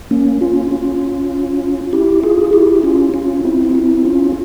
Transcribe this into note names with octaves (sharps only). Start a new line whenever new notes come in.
A#3 C#4
C#4 F4
C#4 F4
E4 G4
F4 G#4
E4 G4
C#4 F4
C#4 F4
C4 E4
F4
C4 E4
C#4 F4